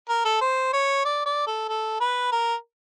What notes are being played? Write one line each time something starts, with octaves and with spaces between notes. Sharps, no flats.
A#4
A4
C5
C#5
D5
D5
A4
A4
B4
A#4